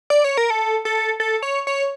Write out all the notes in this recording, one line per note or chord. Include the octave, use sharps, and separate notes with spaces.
D5
C#5
A#4
A4
A4
A4
C#5
C#5